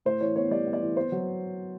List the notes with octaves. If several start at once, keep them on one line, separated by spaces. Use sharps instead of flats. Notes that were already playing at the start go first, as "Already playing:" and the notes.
A2 C5
E3 C#5
B3 C#5
G3 D5
B3
D5
E3
B3 C5
F#3